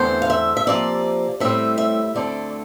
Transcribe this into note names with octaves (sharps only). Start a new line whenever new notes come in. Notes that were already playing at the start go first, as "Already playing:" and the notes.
Already playing: E2 D3 A3 C4 C5
F5
E5
E5
C3 F3 A#3 D5
A2 G3 C4 E5
E5
D2 D3 A3 C4 D5